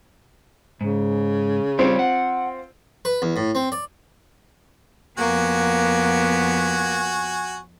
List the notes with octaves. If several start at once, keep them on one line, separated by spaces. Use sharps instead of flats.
G#2 C#3
G3 C4 F4 G4 C#5
F#5
B4
E2
A2
C4
D5
F2 A#3 B3 F#4 G#5